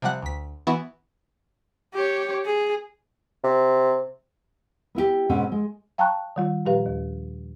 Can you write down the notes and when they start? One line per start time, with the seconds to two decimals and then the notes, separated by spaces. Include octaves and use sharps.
0.02 C3 F3 G3 F#5 F#6
0.22 D2 B6
0.67 E3 B3 E4 F#4
1.94 G4 C#5
2.46 G#4
3.44 C3
4.95 B3 E4 F4 G4
5.29 G#2 B2 C4 C#4
5.52 G#3
5.98 F5 G5 A5 A#5 C#6 F#6
6.36 D#3 G3 F4
6.65 A#2 F3 G3 G4 B4 F5
6.86 D#2